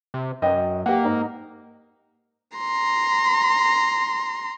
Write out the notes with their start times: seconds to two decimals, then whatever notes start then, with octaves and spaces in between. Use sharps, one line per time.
0.14 C3
0.42 F#2 D#5 G5
0.86 A#3 G4 F#5
1.04 G#2 D#4
2.58 A#5 C6